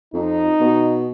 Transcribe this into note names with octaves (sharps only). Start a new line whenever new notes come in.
F2 D#4
B2